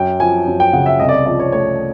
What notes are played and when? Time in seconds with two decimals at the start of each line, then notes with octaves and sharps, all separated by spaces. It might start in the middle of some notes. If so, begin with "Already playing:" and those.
Already playing: F#2 G5
0.20 F3 G#5
0.47 F#2
0.60 G5
0.73 C#3 F#5
0.86 E5
0.99 C2 D#5
1.09 D5
1.13 D#5
1.26 F3 D5
1.39 C#5
1.52 A3 C#5